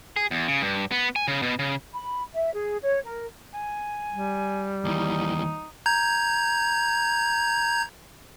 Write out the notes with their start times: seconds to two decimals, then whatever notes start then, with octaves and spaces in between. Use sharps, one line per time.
0.17 G#4
0.31 E2
0.48 C#3
0.62 G2
0.91 B3
1.16 G#5
1.28 C#3
1.42 B2
1.59 C#3
1.93 B5
2.35 E5
2.54 G#4
2.82 C#5
3.05 A#4
3.54 G#5
4.10 G3
4.85 D#2 E3 D#4
5.86 A#5 G6 G#6